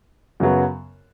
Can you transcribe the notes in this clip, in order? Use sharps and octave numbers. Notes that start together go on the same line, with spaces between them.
F#2 C#3 F#3 B3